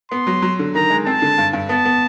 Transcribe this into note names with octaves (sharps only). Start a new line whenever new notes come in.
B3 C6
F#3
F#3
D3
D#3 A#5
G#3
C4 A5
D3
G2
G2
B3 A5
B3